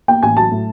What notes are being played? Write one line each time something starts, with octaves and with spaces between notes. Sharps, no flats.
A#3 G5
A1 G#5
F#3 A5
A2